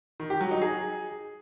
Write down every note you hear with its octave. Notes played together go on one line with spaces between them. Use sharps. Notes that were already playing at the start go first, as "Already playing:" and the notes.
D#3
G4
F#3
D#4
G#4